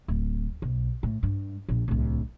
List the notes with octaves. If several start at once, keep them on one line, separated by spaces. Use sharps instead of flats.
D1
B1
A2
G2
A#1
D1 C2